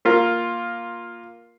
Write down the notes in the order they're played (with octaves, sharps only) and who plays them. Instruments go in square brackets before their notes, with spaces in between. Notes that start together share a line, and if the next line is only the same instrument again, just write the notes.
[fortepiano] A#3 F4 A#4